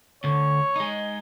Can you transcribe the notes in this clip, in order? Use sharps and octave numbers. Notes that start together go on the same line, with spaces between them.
D2 D3 C#5
G#3 D#4